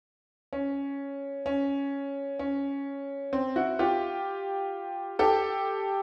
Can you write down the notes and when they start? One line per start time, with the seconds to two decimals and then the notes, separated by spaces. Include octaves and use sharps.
0.53 C#4
1.46 C#4
2.39 C#4
3.33 C4
3.56 E4 F#4
3.79 F4 G4
5.19 G4 A4